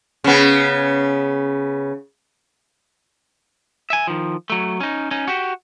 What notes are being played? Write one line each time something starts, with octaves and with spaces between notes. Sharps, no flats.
C#3 B3
E5 G#5
D#3 F3
F#3 A3
C#4 D#4
C#4 D#4
F#4 G4